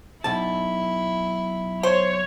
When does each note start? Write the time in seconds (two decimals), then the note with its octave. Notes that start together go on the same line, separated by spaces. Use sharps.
0.24 B1 E4 A5
1.83 C5 C#5